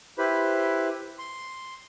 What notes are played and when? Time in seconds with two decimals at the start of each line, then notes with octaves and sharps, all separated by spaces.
0.18 E4 G4 B4 C5 B5
1.19 C6